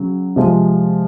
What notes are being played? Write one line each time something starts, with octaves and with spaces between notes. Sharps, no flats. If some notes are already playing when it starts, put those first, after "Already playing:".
Already playing: C#3 F#3
C3 F3 G#3